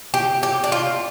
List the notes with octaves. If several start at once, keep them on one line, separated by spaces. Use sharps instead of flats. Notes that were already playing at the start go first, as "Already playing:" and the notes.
G4
G4
D4
F4